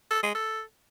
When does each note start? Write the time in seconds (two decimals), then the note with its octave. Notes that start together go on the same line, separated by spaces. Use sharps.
0.11 A4
0.23 G#3
0.35 A4